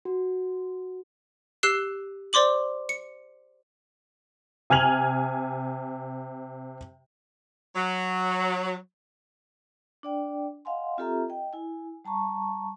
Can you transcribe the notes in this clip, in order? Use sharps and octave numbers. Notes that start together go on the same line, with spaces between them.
F#4
G4 E6 F#6 C7 G7
C5 D5 C6 D6 F#7
C#7
C3 G#5 F6 G#6 F7 F#7
F#3
D4 D5 G5
D#5 F5 F#5 G#5 C6
C4 F4 G4 A4 E5 A#5
D#5 G5
E4 G#5
G3 A5 A#5 C#6